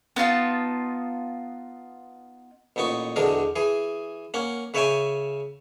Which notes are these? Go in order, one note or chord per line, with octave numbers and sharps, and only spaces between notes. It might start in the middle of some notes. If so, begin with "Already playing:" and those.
B3 D#4 F4 A5
A1 A#2 B3 D#4 C#6
B1 E2 D3 G#3 D4 A#4
E3 G#4
A#3 C#4 F#5
C#3 B4 C#5 E5 G5 G#5